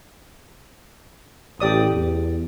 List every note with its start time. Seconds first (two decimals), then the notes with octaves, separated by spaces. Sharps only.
1.60 A1 G4 D5 D#6
1.92 E2